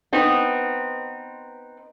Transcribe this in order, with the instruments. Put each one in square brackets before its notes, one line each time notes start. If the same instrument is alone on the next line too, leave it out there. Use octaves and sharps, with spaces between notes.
[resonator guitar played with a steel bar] B3 C4 D#4